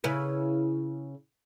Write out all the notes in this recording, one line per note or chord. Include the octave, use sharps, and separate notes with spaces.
C#3 E4 B4